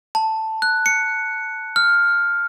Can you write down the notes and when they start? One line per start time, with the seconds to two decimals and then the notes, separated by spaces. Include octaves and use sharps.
0.15 A5
0.62 F#6
0.86 C#7
1.76 F6